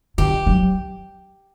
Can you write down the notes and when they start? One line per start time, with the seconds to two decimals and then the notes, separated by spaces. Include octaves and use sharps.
0.18 D3 G4
0.47 F#3